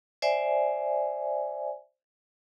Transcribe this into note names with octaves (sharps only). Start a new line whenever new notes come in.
C5 D5 E5 G#5